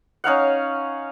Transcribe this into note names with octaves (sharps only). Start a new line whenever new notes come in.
C#4 D#4 F5 F#5